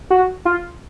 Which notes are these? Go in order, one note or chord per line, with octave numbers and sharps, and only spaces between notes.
F#4
F4